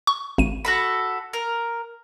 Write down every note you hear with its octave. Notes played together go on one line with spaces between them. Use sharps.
C#6
G#1 D#7
F#4 A4 B5
A#4